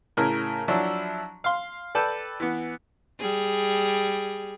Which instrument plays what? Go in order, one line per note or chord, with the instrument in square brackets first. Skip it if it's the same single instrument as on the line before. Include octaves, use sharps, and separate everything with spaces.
[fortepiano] A2 C#3 A#4 F6
F3 F#3 D4 E4
F5 C6
A4 B4 D5 G5 A5
E3 B3
[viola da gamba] G3 G#4